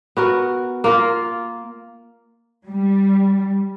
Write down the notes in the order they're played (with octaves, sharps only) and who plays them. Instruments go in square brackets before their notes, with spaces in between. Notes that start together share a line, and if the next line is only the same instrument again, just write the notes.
[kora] B3 F#4 A#4
A#3 F4 A#4
[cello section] G3